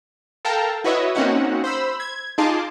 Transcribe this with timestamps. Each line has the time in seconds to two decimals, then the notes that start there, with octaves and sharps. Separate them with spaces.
0.45 A4 A#4 F5 G5 A5 A#5
0.84 E4 F#4 B4 C#5 D#5 E5
1.15 A#3 C4 C#4 D#4 F#4 F#5
1.64 C5 B5 E6
2.00 G#6
2.38 D#4 F4 G#4 A5 C6 D6